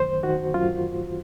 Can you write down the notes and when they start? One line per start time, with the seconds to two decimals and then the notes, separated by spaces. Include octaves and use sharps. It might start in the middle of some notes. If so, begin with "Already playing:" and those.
Already playing: F#2 D#3 C5
0.23 D#3 F#4
0.54 F#2 F4